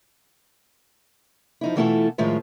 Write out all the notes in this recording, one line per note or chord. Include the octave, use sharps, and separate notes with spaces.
F3 D#4 E4
B2 E3 A3 E4 F4 A4
A2 D#3 F3 G#3 F4 E5